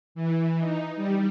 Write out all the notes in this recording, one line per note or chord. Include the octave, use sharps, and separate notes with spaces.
E3
D#4
G3